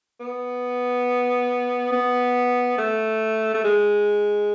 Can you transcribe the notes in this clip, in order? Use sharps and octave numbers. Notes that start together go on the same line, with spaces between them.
B3
B3
A3
A3
G#3